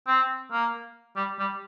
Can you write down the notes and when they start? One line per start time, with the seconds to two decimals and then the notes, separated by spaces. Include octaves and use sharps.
0.07 C4
0.52 A#3
1.16 G3
1.39 G3